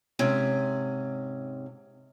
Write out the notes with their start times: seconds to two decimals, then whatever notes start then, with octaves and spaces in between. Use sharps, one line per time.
0.19 G#2 C3 C#4